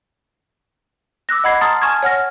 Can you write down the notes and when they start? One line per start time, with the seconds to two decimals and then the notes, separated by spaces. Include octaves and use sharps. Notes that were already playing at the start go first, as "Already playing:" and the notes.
1.29 D6 E6 F#6 A#6
1.44 D#5 F#5 B5 G#6 C7
1.61 A5 A#5 C6 D#6 F6 A6
1.82 G#5 A5 C#6 F6 G#6
2.03 C#5 F#5 F6 A#6